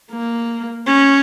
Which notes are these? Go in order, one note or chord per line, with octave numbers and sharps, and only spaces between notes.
A#3
C#4